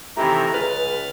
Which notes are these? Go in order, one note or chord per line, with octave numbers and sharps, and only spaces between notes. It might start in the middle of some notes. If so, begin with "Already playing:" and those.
C3 D#3 E3 A3 G4 A#5 B5
C#2 B4 F6 A6